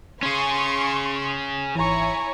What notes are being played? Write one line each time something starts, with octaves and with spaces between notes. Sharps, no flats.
C#4 G#4 C6 C#6
G#1 E3 E4 C#5 G#5 A#5 C#6